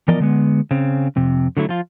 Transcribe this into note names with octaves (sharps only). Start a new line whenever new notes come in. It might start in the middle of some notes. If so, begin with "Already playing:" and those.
E3 F3 B3 A#4 D5 D#5
D3 G#3 B3
C#3 C4
F2 C3
D3 F#3 A3 E4
F3 F4